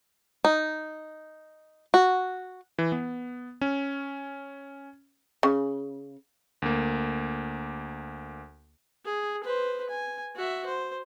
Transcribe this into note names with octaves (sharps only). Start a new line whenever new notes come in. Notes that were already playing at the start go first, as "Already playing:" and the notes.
D#4
F#4
E3
B3
C#4
C#3
D2 A#3
G#4
B4 C5
G#5
F#4 E5
C5